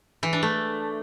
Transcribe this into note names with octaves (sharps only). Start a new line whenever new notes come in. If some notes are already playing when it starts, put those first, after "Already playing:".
E3
D4
A3